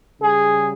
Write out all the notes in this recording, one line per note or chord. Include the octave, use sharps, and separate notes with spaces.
C#3 G3 G#4